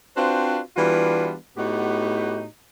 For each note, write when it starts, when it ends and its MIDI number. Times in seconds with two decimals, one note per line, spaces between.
0.17 0.59 60
0.17 0.59 62
0.17 0.59 65
0.17 0.59 66
0.17 0.59 71
0.17 0.59 72
0.77 1.34 52
0.77 1.34 55
0.77 1.34 59
0.77 1.34 62
0.77 1.34 65
0.77 1.34 66
1.57 2.45 45
1.57 2.45 59
1.57 2.45 63
1.57 2.45 66
1.57 2.45 67